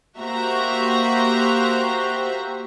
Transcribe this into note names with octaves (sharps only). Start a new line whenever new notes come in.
A#3 F#4 G4 C5 E5 A#5